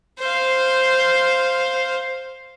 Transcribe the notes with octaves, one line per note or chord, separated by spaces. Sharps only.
C5 F5